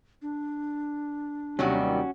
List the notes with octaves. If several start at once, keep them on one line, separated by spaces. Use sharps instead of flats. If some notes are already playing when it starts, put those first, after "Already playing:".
D4
D#2 C3 D#3 F#3 G3 C#4 F#4